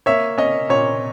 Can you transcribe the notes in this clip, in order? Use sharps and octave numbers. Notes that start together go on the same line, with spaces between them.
A#3 C#5 E5
C#4 D#5
A#2 C#5